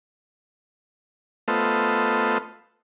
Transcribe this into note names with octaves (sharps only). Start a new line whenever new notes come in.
A3 B3 F4 A4 C5 D#5